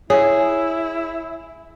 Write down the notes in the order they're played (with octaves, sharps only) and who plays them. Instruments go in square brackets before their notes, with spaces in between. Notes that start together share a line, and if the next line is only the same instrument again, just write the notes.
[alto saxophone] E4 [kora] G#4 [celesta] C#5